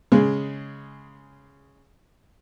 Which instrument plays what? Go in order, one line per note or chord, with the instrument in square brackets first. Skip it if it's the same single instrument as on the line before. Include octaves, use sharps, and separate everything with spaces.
[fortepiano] C#3 G#3